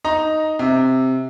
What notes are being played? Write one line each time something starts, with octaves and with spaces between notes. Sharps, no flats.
D#4 A#5
C3